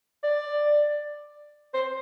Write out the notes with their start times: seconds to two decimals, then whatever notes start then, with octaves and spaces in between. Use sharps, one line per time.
0.23 D5
1.74 C5